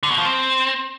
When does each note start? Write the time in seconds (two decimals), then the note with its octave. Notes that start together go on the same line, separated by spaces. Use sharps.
0.03 D3
0.11 B2
0.18 F3
0.25 C4